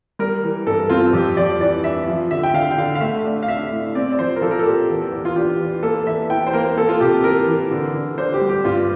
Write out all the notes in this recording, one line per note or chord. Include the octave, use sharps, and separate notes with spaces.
G3 A#4
E3
G2 A4
C4 F4
F2 G4
F2 D5
E3 D5
D4 E5
F3
D3 E5
G5
D3 F5
G5
D3 F5
F5
A3 E5
D4
F5
D4 E5
A2
C4 D5
D5
F3 C5
A#4
F3 A4
A#4
A4
A#2 G4
E2
E2
F4
D4 G4
E3
A#3 A4
E2 E5
E3 G5
C5
A#3 A#4
A#3 A4
F4
C3 G4
E3 A#4
E3
D3
D3
D4 C5
G4
G3
G4
G2 F4